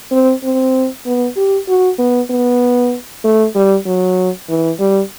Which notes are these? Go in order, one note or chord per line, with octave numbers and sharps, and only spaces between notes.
C4
C4
B3
G4
F#4
B3
B3
A3
G3
F#3
E3
G3